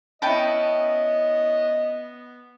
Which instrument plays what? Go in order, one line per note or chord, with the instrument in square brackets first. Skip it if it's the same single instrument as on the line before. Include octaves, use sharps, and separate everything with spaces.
[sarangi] B3 [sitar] C#4 E4 [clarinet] D#5 [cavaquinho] G5 A5 B5